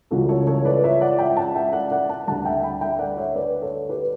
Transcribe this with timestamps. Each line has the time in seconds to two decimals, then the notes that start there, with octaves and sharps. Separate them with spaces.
0.11 C#2 C#3 E3 G3 F#4 A4
0.29 A4 C#5
0.47 A4 C#5
0.65 B4 D5
0.84 C#5 E5
1.01 D5 F#5
1.19 E5 G5
1.37 F#5 A5
1.56 E5 G5
1.73 D5 F#5
1.91 D5 F#5
2.09 F#5 A5
2.27 D2 D3 G3 F#5 A5
2.45 E5 G5
2.63 G5 B5
2.81 E5 G5
2.99 D5 F#5
3.17 C#5 E5
3.35 B4 D5
3.62 A4 C#5
3.89 G4 B4